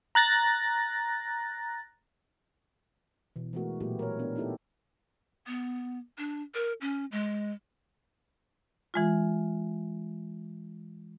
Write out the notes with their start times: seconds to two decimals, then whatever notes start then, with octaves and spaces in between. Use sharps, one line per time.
0.15 A#5 F#6 A6 A#6
3.36 B2 E3
3.53 E3 G#3 A3 B3 F#4 A#4
3.80 A#2 F#3 A3 E4 F#4 G4
3.99 A#4 C#5
4.19 B3 D4
4.36 B3 D#4 E4 G4 A4
5.47 B3
6.18 D4
6.55 A#4
6.81 C#4
7.12 G#3
8.94 E3 G#3 F4